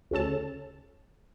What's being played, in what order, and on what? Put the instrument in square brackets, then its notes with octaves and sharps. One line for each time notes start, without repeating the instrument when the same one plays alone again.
[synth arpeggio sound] D2 C#3 C#4 A4 A5